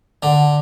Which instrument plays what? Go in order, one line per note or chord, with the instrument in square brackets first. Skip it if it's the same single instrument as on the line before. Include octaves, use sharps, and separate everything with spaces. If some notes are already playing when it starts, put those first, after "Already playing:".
[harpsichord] D3